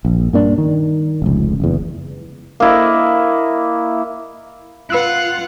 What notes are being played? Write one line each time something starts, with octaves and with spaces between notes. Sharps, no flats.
A#1
G2 A#3 D4
D#3
F1 C#2
F#1 E2
A#3 E4 D#5
F4 B4 F#5 E6 F#6